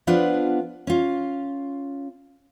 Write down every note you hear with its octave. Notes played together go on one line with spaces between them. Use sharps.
F3 B3 D4 F4 B4 F#5
C#4 F4